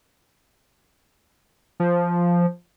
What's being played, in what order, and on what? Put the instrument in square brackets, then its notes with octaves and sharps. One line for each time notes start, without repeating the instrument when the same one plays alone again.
[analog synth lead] F3